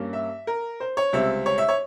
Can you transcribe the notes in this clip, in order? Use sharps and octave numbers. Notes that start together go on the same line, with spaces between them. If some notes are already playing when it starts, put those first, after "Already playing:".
Already playing: G2 G3 A#3 C#4
E5
A#4
C5
C#5
C#2 C3 G3 C4 E5
C#5
E5
C#5